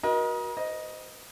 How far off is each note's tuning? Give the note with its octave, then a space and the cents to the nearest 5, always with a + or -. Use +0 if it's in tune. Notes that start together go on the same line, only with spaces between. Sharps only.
F#4 +0 A#4 +40 D#5 +10
C5 -25 D#5 +0